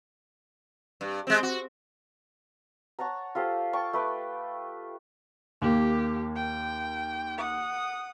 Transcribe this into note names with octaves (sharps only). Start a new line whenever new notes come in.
G2
G#3 C4
F#4
C#5 F#5 A5 A#5
F4 G4 A4 C5
G5 A5 C#6 D6
A3 B4 D6
D#2 A#3 G4
G5
F#5 D#6